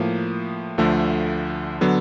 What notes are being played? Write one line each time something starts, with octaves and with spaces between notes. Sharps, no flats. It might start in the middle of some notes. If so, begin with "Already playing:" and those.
Already playing: A2 F3 A#3
D2 D3 F3 A3
D3 F#3 B3